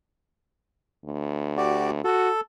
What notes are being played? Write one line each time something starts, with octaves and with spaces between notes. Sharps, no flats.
D2
F#4 G4 D5
F#4 A4